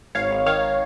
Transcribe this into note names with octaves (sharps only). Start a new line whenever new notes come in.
G#1 C#5 F5
G#1
D#3 C#5 F5